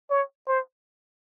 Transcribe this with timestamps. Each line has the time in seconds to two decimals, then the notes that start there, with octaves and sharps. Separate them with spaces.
0.11 C#5
0.48 C5